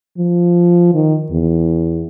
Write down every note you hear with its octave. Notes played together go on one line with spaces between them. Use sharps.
F3
D#3
E2